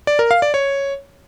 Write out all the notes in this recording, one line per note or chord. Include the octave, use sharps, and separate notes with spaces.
D5
A#4
F5
D5
C#5